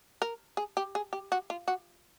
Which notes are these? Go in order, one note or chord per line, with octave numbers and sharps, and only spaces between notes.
A#4
G#4
G4
G#4
G4
F#4
F4
F#4